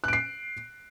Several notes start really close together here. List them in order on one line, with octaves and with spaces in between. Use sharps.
F#6 D7 C7